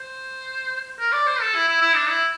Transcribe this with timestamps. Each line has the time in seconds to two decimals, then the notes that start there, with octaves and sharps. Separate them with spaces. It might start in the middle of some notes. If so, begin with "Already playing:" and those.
Already playing: C5
0.99 A#4
1.12 D5
1.26 C5
1.41 A4
1.54 E4
1.68 E4
1.81 E4
1.95 D4
2.09 E4